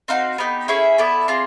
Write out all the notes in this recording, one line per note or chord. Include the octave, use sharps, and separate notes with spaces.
C4 D#4 F#4 F5
B3 D#4 G4
C#4 E4 G#4 E5
B3 E4 A4 D5
C4 F4 G#4